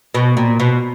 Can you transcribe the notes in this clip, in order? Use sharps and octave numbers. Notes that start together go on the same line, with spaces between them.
B2
A#2
B2